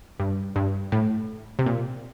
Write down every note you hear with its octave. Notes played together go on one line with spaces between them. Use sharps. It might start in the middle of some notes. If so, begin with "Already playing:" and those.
G2
G2
A2
C3
A#2